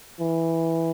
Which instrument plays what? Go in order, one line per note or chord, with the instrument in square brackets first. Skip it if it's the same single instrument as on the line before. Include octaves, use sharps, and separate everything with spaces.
[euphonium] E3